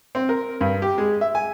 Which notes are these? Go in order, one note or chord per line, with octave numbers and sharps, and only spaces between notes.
C4
A#4
G2
G4
G#3
E5
G#5